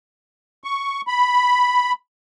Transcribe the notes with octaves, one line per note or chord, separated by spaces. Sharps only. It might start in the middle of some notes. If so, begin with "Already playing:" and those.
C#6
B5